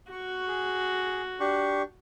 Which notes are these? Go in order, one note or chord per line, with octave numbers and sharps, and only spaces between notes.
F#4 C#6
G#4
D4 G4 C#6